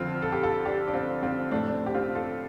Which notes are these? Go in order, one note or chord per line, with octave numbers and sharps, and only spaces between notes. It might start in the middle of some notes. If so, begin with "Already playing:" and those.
Already playing: F2 D3 F3 C4 F4
A4
G4
F4 A4
D4 G4
D4
C4 F4
C4 F4
A2 F3 A3 D4
D4
C4
G4
C4 F4
F4 A4